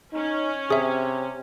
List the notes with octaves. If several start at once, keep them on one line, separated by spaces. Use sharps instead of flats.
C#4 D#4
C3 G#4 E5